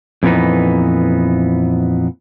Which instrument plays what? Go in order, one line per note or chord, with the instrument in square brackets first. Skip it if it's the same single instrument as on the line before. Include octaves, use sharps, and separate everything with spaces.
[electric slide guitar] F2 A#2 E3 B3 D#4